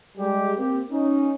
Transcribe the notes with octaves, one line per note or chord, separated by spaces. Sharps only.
G3 G#3 G4
A#3 C4 G4
C#4 D#4